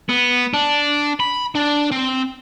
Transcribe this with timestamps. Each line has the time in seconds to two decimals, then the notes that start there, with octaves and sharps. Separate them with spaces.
0.09 B3
0.54 D4
1.20 B5
1.55 D4
1.91 C4